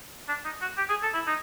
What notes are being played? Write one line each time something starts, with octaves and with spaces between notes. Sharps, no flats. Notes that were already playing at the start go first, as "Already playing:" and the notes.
D4
D#4
F#4
G4
G#4
A4
E4
D#4